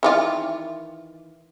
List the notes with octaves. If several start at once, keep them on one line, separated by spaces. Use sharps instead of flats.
D#3 E3 F4